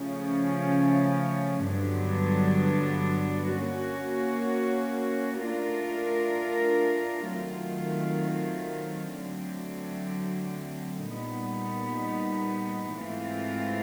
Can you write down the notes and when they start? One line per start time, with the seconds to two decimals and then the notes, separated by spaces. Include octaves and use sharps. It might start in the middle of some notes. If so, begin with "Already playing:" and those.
Already playing: C#3 F3 A3 C#4
1.68 G2 D3 F#3 B3 D4
3.56 A#3 C#4 F#4
5.44 A3 D4 F4 A#4
7.31 D#3 F#3 A3 C4 F4
9.19 D3 F#3 A3 C4
11.06 A#2 G3 B3 D#4
12.95 G#2 E3 A3 C4 F4